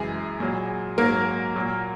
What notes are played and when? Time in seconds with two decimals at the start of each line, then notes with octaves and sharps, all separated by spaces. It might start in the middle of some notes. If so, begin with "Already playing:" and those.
Already playing: F#2 C#3 E3 G#3 G#4
0.40 A#2 F#3
0.98 G#2 F#3 A#3 A#4
1.56 A#2 F#3